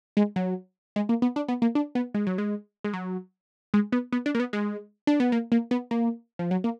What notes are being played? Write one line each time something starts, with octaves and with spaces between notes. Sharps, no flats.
G#3
F#3
G#3
A#3
B3
D4
B3
A#3
D4
B3
G#3
F#3
G#3
G#3
F#3
G#3
B3
B3
D4
A#3
B3
G#3
D4
B3
A#3
A#3
B3
A#3
F3
F#3
A#3